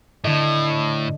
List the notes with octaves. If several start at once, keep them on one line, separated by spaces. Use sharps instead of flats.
A2 D3 D#5